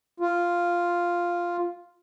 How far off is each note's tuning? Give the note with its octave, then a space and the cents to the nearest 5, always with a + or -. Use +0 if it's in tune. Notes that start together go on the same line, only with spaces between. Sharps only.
F4 +0